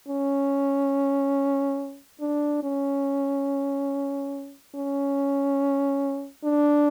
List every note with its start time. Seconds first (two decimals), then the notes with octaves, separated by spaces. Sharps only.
0.08 C#4
2.21 D4
2.63 C#4
4.75 C#4
6.45 D4